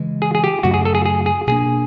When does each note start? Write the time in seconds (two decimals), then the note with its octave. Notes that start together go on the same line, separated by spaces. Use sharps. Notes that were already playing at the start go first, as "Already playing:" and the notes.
Already playing: C#3 E3 G#3
0.22 G#4
0.35 G#4
0.44 G4
0.63 F#2 C#3 F#3 A3 F#4
0.74 G#4
0.85 A4
0.95 G#4
1.05 G#4
1.26 G#4
1.47 B2 G3 A#3 D4 G#4